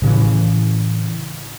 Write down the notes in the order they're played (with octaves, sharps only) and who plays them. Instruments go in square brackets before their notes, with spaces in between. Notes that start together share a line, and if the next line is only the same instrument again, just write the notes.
[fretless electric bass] A2 C#3 E3